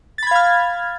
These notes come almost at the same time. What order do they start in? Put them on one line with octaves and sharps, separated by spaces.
A6 B5 G#6 F5 F6